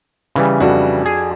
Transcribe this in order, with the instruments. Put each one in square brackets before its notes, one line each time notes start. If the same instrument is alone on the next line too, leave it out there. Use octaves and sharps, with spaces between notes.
[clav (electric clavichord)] C#3 E3 G3
[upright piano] F2 D4 F#4
[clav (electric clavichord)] G#4